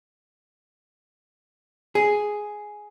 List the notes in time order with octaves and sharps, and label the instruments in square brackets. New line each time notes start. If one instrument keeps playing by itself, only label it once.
[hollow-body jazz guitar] G#4